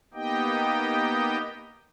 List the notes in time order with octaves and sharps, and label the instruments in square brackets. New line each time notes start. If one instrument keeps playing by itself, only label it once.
[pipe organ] A#3 B3 D#4 G4 D#5 G5